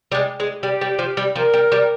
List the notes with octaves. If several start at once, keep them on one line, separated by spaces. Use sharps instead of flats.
G3
G#3
G#3
G3 G4
G3
F3
G3
F3 A#4
G3
G3